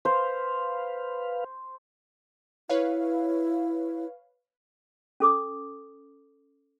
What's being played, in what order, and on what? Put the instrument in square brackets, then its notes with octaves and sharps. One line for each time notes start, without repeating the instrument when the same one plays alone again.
[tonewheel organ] B4 F5 [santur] C5
[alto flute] E4 [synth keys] B4 C#5 F5
[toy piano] C#4 A4 D6 D#6